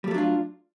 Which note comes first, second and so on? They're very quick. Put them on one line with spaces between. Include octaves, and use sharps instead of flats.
G3 A3 F#3 D4 F4